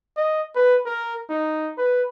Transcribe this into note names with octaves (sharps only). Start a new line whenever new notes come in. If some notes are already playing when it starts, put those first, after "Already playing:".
D#5
B4
A#4
D#4
B4